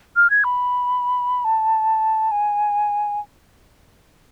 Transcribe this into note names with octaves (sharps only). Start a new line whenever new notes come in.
F6
G#6
B5
A5
G#5